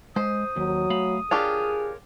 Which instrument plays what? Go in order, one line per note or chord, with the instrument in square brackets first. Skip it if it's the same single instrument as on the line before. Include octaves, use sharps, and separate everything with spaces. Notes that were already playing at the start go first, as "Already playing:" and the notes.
[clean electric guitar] G#3 [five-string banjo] C5 [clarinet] D#6
[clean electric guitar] D#2 [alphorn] F#3
[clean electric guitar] A3 F5 B5
[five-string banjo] D4 F4 G4 [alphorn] G#4 [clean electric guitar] A#4 C#5